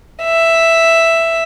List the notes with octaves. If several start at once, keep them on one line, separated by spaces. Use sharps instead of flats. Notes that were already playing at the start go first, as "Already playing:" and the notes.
E5